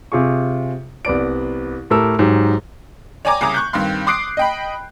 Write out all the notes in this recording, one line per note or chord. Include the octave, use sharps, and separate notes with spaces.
C3 F4 G#4 C#6
C2 B3 D5 D7
A2 G4 A4 A#4 E6
G#2 F#3 G4
C#5 D5 G5 G#5 A#5 D6
C2 C#3 G#5 A#5 D6 D#6
C#6 F#6 G6
G2 D#3 C4 F5 C6
C6 D6 D#6 F#6 C7 D7
D#5 G5 B5